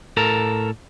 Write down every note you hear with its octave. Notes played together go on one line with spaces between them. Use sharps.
A2 A4 A#4